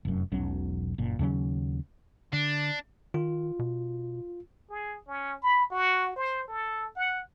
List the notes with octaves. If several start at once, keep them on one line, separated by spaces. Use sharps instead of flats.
F1 F#2
E1 B1 F#3 C#4
F#1 A#2
D#2 C#3 F#3 C#4
D3 D4
D#3 F4
B2
G#4
C#4
B5
F#4
C5
A4
F#5